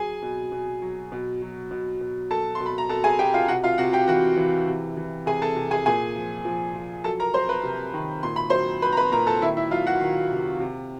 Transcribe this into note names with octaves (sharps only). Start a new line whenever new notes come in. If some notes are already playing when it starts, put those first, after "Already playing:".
Already playing: F#3 G#4 G#5
B2
B2
F#3
B2
F#3
B2
B2
F#3 A4 A5
C6
B2
B5
A#5
B2 A4 A5
G#4 G#5
B2 G4 G5
F4 F5
C3 F#4 F#5
F4 F5
C3 F#4 F#5
G4 G5
E3 F#4 F#5
E3
C3
E3
C3 G#4 G#5
A4 A5
C3
G#4 G#5
A#2 G#4 G#5
F3
F3
F3
F#3 A4 A5
A#4 A#5
F#3 C5 C6
B4 B5
C3
D#3
A#2 C6
B5
F#3 C5 C6
F#3 B4 B5
A#5
B4 B5
A#2 A#4 A#5
A4 A5
D#3 E4 E5
E4 E5
F#3 F4 F5
F#4 F#5
D#3
C3
C3